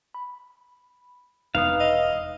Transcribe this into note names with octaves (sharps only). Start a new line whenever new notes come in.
B5
E1 D#4 B4 F5 D#6
D#5 E6